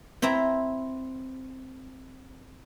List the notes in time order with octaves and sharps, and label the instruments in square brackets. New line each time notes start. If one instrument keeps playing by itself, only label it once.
[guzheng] C4 E4 E5 A#5